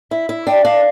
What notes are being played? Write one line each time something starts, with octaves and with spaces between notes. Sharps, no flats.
E4 E5
E4
D4 G5
D4 F5